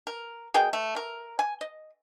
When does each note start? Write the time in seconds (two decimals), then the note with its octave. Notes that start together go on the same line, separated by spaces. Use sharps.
0.07 A#4
0.54 B2 G#4 A#4 G5
0.73 A3
0.96 A#4
1.39 G#5
1.61 D#5